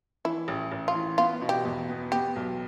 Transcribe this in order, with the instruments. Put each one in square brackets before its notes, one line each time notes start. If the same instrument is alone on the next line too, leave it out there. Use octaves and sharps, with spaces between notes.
[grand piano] E3 [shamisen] E4
[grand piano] A1
A1
[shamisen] F4
[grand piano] E3
[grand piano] B3 [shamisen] F4
[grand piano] B2
[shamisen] G4
[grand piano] E2
B3
[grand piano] B3 [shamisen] G4
[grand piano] B1